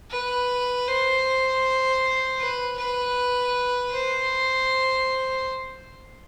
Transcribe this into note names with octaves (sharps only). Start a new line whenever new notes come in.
B4
C5
B4
B4
C5